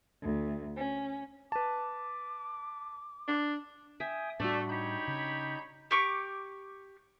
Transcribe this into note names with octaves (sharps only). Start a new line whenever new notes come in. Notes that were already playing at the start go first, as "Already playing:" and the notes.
D2
C#4
B4 A5 D6
D4
E5 G5 G#5 D#6
A2 G3 A3 D4 F#4 D5
D#4 G4 C#5 B5 G6
C#3
G4 C#6 D6